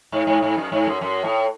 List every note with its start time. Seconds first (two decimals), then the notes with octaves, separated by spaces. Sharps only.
0.12 G#2
0.27 G#2
0.42 G#2
0.57 F#2
0.72 G#2
0.87 F#2
1.01 F#2
1.24 A2